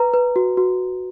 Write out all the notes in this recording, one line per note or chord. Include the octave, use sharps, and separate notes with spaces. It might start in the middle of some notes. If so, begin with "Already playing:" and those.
Already playing: B4 A#5
B4
F#4
F#4